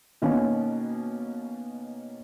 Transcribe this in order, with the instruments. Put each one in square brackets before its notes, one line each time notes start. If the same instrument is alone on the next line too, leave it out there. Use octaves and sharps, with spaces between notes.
[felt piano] B2 D#3 A#3 B3 C#4